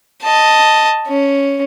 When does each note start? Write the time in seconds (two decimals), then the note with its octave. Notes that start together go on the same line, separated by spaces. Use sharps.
0.23 D#5 A5
1.07 C#4